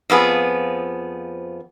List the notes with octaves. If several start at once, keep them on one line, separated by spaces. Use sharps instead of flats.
F2 F3 B3 G#4